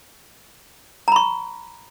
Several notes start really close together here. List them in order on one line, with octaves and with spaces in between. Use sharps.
A#5 B5 C#6